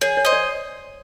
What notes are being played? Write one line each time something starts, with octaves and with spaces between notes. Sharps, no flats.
G#4 C#5
C#5
C5 D#5
D5